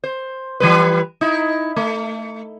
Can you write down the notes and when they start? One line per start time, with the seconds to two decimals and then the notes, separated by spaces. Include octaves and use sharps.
0.04 C5
0.60 E3 G3 B4
1.21 D#4 E4
1.76 A3